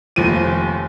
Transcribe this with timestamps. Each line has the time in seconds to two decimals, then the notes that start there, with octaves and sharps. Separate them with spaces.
0.16 F1 D#2 F3 D#7